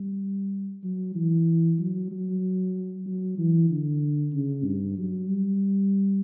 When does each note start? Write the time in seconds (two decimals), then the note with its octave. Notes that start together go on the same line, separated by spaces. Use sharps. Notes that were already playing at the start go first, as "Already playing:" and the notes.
Already playing: G3
0.83 F#3
1.15 E3
1.79 F#3
2.11 F#3
3.06 F#3
3.38 E3
3.70 D3
4.33 C#3
4.65 G2
4.98 F#3
5.29 G3